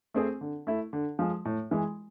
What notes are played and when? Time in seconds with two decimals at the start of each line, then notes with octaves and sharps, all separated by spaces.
0.14 A3 C4 G#4
0.41 D3
0.67 A3 E4
0.93 D3
1.19 F3 G#3
1.45 A2
1.71 E3 G#3